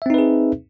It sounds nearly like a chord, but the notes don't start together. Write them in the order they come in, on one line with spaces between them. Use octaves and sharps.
E5 C4 D#4 B4 G#4